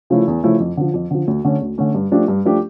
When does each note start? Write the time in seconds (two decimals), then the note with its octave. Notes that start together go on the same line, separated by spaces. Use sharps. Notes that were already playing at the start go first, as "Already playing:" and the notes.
0.10 C#3 F3 A3 E4
0.28 E2
0.43 C#3 F3 A3 E4
0.60 F2
0.77 D3 F3
0.94 F2
1.11 D3 F3
1.28 D2
1.45 D3 A3 C#4
1.62 D2
1.78 D3 A3 C#4
1.94 G2
2.12 F3 A3 D4 G4
2.28 G2
2.45 F3 A3 D4 G4